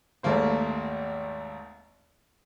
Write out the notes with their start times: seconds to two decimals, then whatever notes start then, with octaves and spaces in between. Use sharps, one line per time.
0.23 G#1 D#2 A3 A#3 C5